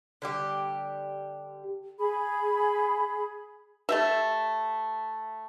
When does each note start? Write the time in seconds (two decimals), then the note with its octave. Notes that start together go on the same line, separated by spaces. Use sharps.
0.22 D3 G3 G4
1.99 G#4 B5
3.89 A3 G4 E5